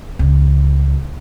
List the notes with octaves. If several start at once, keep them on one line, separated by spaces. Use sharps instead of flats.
C#2